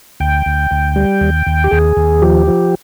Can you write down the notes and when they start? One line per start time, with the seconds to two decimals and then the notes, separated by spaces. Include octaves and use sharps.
0.20 D2 G5
0.46 D2
0.71 D2
0.96 G3
1.21 D#2
1.47 D#2
1.64 G4
1.71 D#2 G#4
1.97 D#2
2.22 F3 G4
2.47 F3